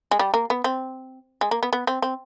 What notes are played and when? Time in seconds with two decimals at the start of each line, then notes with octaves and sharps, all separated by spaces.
0.11 G#3
0.19 G3
0.34 A#3
0.50 B3
0.64 C4
1.41 G#3
1.51 A#3
1.63 B3
1.73 B3
1.87 C4
2.02 C4